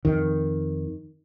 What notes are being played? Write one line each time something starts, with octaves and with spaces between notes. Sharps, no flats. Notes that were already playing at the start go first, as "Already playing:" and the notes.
F2 D#3